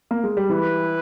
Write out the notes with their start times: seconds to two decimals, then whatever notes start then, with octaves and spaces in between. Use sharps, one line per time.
0.11 A#3
0.24 G#3
0.37 G3
0.50 E3 E4 G4 B4